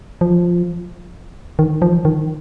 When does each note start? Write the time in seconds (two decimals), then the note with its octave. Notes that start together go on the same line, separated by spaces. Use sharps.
0.21 F3
1.59 D#3
1.82 F3
2.05 D#3